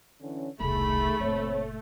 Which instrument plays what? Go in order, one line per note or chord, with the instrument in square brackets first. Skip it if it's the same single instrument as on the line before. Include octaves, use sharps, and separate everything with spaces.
[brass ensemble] D3 E3 C#4
[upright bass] E1 C2 [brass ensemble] D#3 G#4 [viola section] A3 [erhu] B5
[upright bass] F#1 A#2 [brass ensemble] C4 C#5